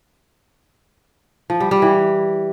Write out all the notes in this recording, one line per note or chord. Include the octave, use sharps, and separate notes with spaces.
F3
G3
G3
E3